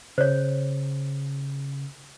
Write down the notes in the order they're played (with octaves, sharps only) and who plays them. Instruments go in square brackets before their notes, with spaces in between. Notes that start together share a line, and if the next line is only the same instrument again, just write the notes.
[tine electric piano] C#3 [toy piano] C5 C#5